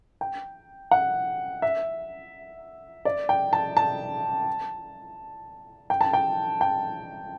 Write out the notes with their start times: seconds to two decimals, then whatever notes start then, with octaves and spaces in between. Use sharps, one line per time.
0.21 G5
0.91 F#5
1.62 E5
3.05 D5
3.29 G5
3.53 A5
3.77 A5
5.90 G5
6.01 A5
6.13 G5
6.61 G5